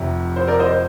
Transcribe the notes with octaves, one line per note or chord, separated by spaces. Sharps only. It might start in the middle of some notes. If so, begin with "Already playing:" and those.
Already playing: F1 F2 C3
C5
A#4 D5
C5 D#5
C5